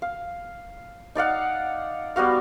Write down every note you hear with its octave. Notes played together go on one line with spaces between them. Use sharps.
F5
D#4 D5 F5 F#5
G3 B3 F#4 F5